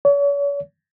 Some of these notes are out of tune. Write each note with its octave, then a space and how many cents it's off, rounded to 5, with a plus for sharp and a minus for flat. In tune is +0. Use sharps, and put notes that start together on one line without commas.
C#5 +40